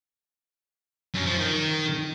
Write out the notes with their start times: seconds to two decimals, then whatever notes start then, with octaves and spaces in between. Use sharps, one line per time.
1.14 F#2
1.26 F3
1.38 D#3